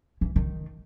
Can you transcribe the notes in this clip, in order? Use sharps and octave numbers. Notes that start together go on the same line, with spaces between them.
E3
D#3